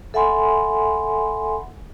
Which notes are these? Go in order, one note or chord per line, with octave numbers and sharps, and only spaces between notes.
A4 E5 F#5 G#5 B5 C6